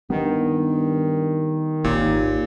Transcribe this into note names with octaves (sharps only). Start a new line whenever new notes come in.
G2 D#3 B3
G#1 D#2 A#2